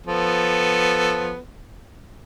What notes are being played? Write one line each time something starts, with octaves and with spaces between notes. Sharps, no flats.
F3 B3 A4